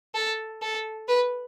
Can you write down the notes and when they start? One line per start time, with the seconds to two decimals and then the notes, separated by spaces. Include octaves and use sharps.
0.14 A4
0.62 A4
1.08 B4